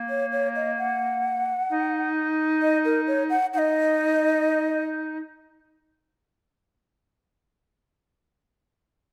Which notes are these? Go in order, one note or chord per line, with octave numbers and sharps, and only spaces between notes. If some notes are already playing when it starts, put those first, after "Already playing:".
Already playing: A#3
C#5
C#5
D#5
F#5
D#4
D#5
A#4
C#5
F#5
D#4 F#5
D#5